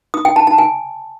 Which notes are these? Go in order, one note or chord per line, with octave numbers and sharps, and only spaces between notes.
D#6
G5
A5
A5
G#5